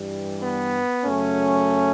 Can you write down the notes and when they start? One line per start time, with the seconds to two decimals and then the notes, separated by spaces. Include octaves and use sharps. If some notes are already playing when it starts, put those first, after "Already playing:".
Already playing: G2 E3 G3
0.43 B3
1.05 F#2 C#3 F#3 A3 C#4